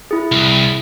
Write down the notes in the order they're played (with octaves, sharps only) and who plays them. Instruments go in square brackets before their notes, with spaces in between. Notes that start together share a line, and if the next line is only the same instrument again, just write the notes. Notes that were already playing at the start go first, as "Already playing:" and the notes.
[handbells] E4 G#4
[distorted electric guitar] C2